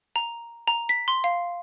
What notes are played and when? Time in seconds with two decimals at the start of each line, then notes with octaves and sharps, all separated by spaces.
0.16 A#5
0.68 A#5
0.89 B6
1.08 C6
1.24 F5